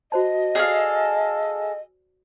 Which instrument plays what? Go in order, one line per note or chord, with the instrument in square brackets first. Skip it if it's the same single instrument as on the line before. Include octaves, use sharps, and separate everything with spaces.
[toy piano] F#4 C5 A5 [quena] D#5
[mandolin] G#4 A4 F5 [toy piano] D5